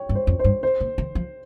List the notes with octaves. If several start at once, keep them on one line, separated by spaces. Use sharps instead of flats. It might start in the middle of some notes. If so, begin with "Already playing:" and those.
Already playing: C#5 G5
G2
C5
F2
G2 C5
C5
A#2
D#3
F3